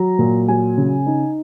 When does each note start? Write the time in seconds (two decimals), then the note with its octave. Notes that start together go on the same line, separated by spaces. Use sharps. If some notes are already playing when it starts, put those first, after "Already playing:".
Already playing: F#3 A#5
0.19 A#2
0.48 F#3 G#5
0.77 C#3
1.06 D#4